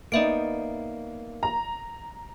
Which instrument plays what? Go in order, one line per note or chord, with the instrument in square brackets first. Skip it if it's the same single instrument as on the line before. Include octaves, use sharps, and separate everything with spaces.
[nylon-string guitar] A#3 B3 D#4 [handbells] D5 E5 D7
[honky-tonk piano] A#5